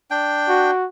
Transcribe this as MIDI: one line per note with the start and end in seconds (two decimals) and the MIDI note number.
0.11 0.71 62
0.11 0.71 79
0.49 0.86 66